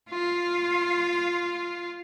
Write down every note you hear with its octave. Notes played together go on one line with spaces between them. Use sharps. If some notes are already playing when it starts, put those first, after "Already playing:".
F4 F5